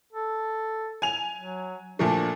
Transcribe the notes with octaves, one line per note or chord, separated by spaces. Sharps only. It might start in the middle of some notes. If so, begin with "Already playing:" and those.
A4
G#5 F7
F#3
A#2 F3 A3 D4